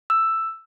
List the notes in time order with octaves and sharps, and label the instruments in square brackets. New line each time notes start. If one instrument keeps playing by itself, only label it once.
[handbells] E6